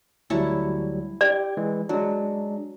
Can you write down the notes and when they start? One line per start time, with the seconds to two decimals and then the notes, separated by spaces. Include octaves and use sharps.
0.30 D2 F#3 G3 E4 C#5 A5
1.21 G4 D5 G5
1.57 E3 G#3
1.89 F#3 G#3 D4